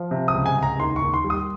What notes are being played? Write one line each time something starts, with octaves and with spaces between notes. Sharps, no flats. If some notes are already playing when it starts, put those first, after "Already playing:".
Already playing: F3
C3
D#6
C#2
G#5
C#2
A#5
D#2 C6
C#6
D#2
C6
G3
D#6